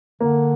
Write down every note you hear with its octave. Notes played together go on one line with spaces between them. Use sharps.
D3 A#3